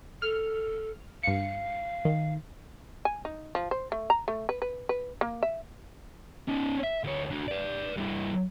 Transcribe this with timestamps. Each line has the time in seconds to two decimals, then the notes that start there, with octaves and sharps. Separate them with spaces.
0.22 A4 F6
1.23 G2 F5 C#7
2.05 D#3
3.05 G#5
3.25 D#4
3.55 F3
3.71 C5
3.92 A3
4.10 A#5
4.28 A3
4.49 B4
4.62 B4
4.89 B4
5.21 A#3
5.43 E5
6.48 C#4 D#4
6.84 E5
7.04 D2 C#5
7.31 D4 F#4
7.48 B4 D5
7.97 G2 E4